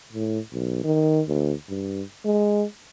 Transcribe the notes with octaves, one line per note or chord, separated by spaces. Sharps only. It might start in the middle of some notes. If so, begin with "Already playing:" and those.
A2
B1
D#3
D2
G2
G#3